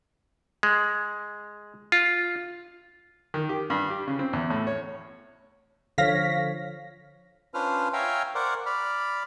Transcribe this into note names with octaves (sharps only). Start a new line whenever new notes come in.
G#3
F4
D#3
G4
G2
G4
C#3
C4
E2
A2
C#5
D3 F3 C#5 F5 A#6 B6
C#4 D4 F4 B4 C5 F6
C#5 E5 F5 G5 G#5 A#5
A#4 C5 D5 F#5 C#6
D5 B5 F6